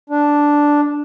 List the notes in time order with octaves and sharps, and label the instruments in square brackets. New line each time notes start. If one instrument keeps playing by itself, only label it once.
[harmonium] D4